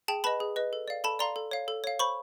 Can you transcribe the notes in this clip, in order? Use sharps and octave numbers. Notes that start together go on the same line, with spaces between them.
G#4 G5 A5
B4 D#5 A5 B5
G#4
B4 D#5
A4
D5 F5
A4 A5 B5
D5 F5 A#5 C6
A4
C#5 F5
A4
C#5 F5
C5 B5 C#6